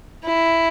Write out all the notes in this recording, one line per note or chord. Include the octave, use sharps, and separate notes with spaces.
E4